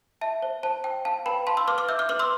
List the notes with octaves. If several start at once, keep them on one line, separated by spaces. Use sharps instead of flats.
E5 A5
C5
C5 A5
G5
F5 A5
B4 G5 B5
F5 A5 C6
C6 E6
B4 D6 F6
D6 F6
E5 E6 G6
D6 F6
B4 D6 F6
C6 E6